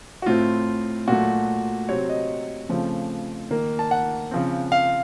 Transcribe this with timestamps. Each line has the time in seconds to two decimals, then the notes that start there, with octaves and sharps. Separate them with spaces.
0.22 F#4
0.26 A2 A3 C4 F4
1.08 A#2 F#3 A3 F#4
1.89 C3 F#3 C4 C#5
2.09 D#5
2.69 C#3 F3 A3 C4
3.50 D#3 A#3
3.79 A5
3.91 F#5
4.31 C#3 F3 C4
4.72 F5